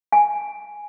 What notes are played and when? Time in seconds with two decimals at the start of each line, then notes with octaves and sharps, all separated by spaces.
0.12 G#5